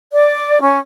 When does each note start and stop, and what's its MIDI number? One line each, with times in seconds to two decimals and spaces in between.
0.12 0.62 74
0.62 0.78 61